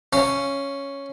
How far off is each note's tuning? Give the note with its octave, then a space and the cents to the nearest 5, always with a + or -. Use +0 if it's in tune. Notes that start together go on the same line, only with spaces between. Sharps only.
C#4 +0 F5 -30